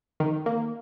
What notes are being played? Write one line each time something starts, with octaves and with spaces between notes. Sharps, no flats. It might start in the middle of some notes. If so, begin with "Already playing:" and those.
D#3
A#3